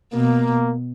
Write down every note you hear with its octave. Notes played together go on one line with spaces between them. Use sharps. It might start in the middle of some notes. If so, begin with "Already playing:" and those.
B2 A#3